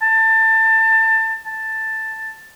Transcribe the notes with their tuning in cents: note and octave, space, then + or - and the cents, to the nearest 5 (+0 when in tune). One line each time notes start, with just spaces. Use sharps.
A5 +25
A5 +5